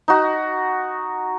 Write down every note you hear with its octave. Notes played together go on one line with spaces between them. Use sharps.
D#4 F#4